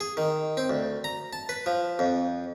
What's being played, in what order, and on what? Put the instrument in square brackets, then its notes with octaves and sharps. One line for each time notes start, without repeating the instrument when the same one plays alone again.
[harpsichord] G#4
D#3
C4
D2
A#5
A5
B4
F3
F2